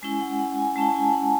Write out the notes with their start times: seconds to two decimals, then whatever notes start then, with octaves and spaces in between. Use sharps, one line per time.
0.02 G#3 C#4 E4 G#5
0.21 F#5
0.39 F#5
0.58 G#5
0.76 G#3 C#4 E4 A5
0.95 G#5
1.13 F#5